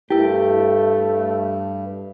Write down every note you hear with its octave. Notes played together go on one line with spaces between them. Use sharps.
G2 A3 E4 G4 A#4